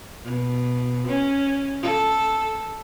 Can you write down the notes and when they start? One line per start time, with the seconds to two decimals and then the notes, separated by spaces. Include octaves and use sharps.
0.24 B2
1.08 C#4
1.82 A4